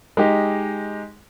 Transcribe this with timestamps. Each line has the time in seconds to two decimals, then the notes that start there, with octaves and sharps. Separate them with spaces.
0.17 G#3 D#4 G4